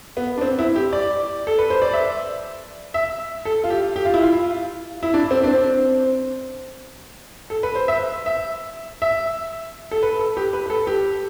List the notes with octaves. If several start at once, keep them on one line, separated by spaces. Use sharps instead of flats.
B3
D4
C4
E4
G4
D5
A4
B4
C5
D5
E5
E5
A4
F4
G4
G4
F4
E4
F4
E4
D4
C4
D4
C4
A4
B4
C5
E5
E5
E5
A4
B4
A4
G4
B4
B4
A4
G4